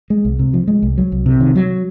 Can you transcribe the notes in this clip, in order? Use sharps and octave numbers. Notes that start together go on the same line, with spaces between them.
G#3
C2
C3
F3
G#3
C2
F#3
C2
C3
D#3
F#3